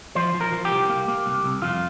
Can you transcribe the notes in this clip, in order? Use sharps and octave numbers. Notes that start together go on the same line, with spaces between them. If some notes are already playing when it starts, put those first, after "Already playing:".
F3 C5
F3
A#4
F3
G4
C2
A#3
A#3
C2
C2
F2 F4